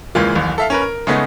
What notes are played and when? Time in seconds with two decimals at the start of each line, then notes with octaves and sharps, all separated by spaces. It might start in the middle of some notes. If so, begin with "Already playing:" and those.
0.15 G#1 C#2 E3 G#3 A#3 F4
0.35 D1 A1 D#2
0.58 A4 E5 F5
0.70 C#4 A#4 B4
0.82 A#4
1.07 C#3 G#3 A3 B3 D#4